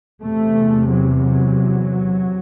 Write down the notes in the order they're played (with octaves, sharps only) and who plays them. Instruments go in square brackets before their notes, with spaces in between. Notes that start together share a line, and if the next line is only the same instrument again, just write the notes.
[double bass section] E2 C3 A3
F#3
F#3